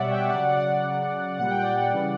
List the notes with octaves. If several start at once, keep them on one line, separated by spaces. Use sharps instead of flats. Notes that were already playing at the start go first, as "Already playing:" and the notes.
Already playing: B2 G3 C#5 D5 E5 F#5
E5 G5
C#3 F#3 D5 F#5
D5 F#5
C#3 F#3
A#2 G3 F#5
G5
D5 F#5
C#3 E3 G3